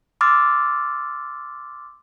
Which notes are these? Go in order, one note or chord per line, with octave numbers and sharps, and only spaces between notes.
C6 D6 E6 F6 A6